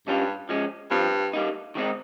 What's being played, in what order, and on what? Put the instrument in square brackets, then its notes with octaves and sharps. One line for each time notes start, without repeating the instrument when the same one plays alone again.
[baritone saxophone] G2 [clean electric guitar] G3 C#4 F4
[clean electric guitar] F3 G#3 C#4
[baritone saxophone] G2 [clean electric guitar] F3 C4 F4
[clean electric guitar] G3 A#3 D#4
D#3 G#3 C4 D#4